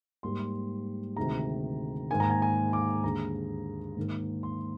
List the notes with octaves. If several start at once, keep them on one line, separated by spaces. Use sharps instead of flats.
G#2 G3 A#3 C6
D2 C3 D#3 G#3 A#5
G#2 D#3 A#3 G#5
A#5
G#5
G#5
D6
D#2 D3 G#3 A#5
G#2 D#3 A#3
C6